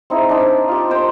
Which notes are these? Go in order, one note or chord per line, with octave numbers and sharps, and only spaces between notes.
C4 D#4 E4 G#4
D4 D#4 G5
F4 G4
D#4 A#4 C5 G5